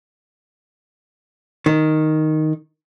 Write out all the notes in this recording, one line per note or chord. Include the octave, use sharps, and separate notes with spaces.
D#3